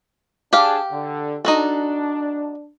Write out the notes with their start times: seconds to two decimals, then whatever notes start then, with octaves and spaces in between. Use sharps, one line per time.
0.53 D4 G4 G#4 F5 A5
0.91 D3
1.45 D4 D#4 F#4 A4